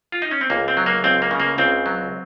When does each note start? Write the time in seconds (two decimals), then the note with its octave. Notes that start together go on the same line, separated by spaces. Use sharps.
0.12 F4
0.22 D#4
0.31 C#4
0.41 C4
0.50 C#2 A#3
0.68 C4
0.77 F#3
0.86 A#3
1.04 C#2 C4
1.22 A#3
1.31 C#3
1.40 A#3
1.58 C#2 C4
1.86 F#3